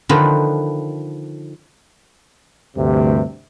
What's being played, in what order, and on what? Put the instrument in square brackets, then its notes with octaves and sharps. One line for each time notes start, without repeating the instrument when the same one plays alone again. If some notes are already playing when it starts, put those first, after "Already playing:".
[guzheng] D3 D#3 F3 F4 B4
[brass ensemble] D2 G2 C3